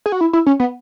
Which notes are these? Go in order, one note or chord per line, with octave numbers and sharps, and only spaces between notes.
G#4
F#4
E4
E4
C#4
B3